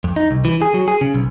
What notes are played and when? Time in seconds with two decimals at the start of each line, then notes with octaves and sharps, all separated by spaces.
0.04 F2
0.16 D#4
0.31 C2
0.45 E3
0.62 G#4
0.74 F#3
0.88 G#4
1.01 C#3
1.14 B1